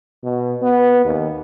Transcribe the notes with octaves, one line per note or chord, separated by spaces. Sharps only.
B2
B3
D#2